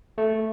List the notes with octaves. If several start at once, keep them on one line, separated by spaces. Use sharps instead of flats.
A3